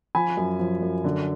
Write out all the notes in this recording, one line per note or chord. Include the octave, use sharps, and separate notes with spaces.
F3 G#5 B5
F#2
F3
F#2
D3